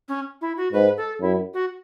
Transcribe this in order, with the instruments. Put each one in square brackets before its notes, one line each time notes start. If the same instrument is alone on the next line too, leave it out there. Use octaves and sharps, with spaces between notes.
[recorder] C#4
E4
F#4
[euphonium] G#2 [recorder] B4
[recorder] A4
[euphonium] F#2 [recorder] E4
[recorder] F#4